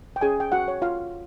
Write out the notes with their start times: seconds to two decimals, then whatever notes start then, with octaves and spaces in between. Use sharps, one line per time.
0.16 G5
0.21 C#4 G#4 G#5
0.40 G5
0.52 F#4 F#5
0.68 C#5
0.82 F4 F5